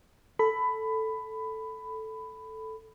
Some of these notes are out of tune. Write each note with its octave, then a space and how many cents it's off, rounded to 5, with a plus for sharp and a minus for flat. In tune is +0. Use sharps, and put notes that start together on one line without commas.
A4 +0 B5 +15